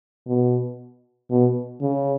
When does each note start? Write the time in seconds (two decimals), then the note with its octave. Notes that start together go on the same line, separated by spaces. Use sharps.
0.26 B2
1.30 B2
1.81 C#3